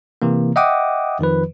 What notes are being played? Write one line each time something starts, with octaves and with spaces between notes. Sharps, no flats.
C3 E3 A#3
D#5 E5 F#5 G5 D6 D#6
F2 D#3 F3 B4